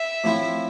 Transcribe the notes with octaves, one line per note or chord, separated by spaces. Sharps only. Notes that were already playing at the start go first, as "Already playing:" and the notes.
Already playing: E5
A2 F3 C4 E4